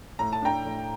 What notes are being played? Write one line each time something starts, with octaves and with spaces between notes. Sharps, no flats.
A2 A#5
A5
D4 G5 A#5
A2